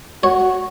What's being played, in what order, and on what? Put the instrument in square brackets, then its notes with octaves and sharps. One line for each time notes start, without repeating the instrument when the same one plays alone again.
[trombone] F#4 [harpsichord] C#5